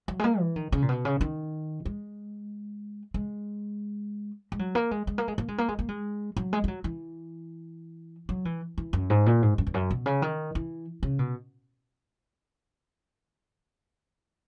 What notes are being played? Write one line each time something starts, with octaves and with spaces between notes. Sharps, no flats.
F#3
G#3
A#3
E3
D#3
C#3
A#2
B2
C#3
D#3
G#3
G#3
G#3
F#3
A#3
G#3
G#3
A#3
G#3
A#3
G#3
A#3
G#3
A#3
G#3
F#3
G#3
G#3
F#3
E3
F#3
E3
E3
F#2
G#2
A#2
G#2
F#2
E2
F#2
B2
C#3
D#3
E3
C#3
B2